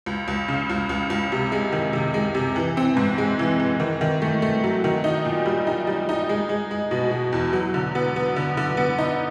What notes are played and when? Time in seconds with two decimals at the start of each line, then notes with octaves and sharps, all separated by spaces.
0.06 C#2
0.28 C#2
0.48 C#3
0.70 C#2
0.89 C#2
1.10 C#2
1.32 C3
1.52 G#3
1.72 D#3
1.93 C3
2.14 G#3
2.35 C3
2.56 E3
2.77 C4
2.97 G#2
3.18 G#3
3.39 E3
3.60 E3
3.80 D#3
4.01 D#3
4.22 A3
4.42 A3
4.64 F#3
4.84 D#3
5.04 D#4
5.25 A#2
5.46 G3
5.67 D#4
5.87 G3
6.09 D#4
6.29 G#3
6.49 G#3
6.71 G#3
6.91 B2
7.11 B2
7.33 E2
7.53 F#3
7.74 D3
7.95 B3
8.16 B3
8.36 D3
8.57 D3
8.77 B3
8.98 D#4